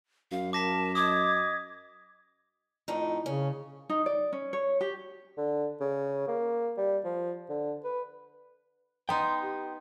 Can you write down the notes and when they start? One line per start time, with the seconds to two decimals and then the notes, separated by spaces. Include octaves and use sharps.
0.32 F#2 F5
0.53 A#4 A5 D6 A#6 B6
0.95 D#5 D6 D#6 G#6
2.88 F2 A2 D#4
3.26 C#3 C#4
3.90 D#4
4.06 D5
4.33 C#4
4.53 C#5
4.81 G4
5.37 D3
5.80 C#3
6.28 A#3
6.77 G3
7.04 F3
7.49 D3
7.84 B4
9.09 B3 D#4 G5 C6
9.41 G4